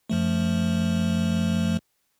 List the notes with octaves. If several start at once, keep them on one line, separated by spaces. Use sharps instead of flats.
F#2 F3 A3